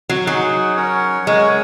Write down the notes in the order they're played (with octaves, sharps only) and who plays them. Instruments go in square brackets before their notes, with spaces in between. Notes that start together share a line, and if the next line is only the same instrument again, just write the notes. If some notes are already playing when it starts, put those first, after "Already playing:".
[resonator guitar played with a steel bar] F#3
[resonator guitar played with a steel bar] F#3 [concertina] D#4 G#4 F#5
[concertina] C#4 A#4 C#5 F#5
[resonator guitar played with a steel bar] G#3 [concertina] C#4 A#4 C#5 F#5